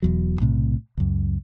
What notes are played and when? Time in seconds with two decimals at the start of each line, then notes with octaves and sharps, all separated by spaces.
0.02 E1 E2 F#3
0.40 B1 A2 C3
0.97 C#2 F#2